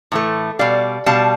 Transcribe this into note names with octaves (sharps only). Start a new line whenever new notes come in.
A2 E3 A3
B2 G3 D5 F5
B2 G3 F5 A5